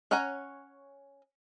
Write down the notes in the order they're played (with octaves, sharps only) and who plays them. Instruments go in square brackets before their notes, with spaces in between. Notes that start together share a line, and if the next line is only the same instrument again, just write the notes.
[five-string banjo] C#4 C#5 F#5 G#5 A#5